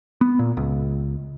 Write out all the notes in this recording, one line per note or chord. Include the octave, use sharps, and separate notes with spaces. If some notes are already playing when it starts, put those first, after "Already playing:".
B3
A#2
C#2